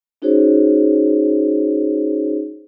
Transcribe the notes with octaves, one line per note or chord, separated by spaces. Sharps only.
C#4 D#4 F#4 G#4 C5 C#5